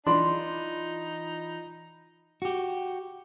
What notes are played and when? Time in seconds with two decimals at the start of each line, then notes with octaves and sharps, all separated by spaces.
0.07 E3 D4 D#4 F4 B5 C6
2.42 F#4 G4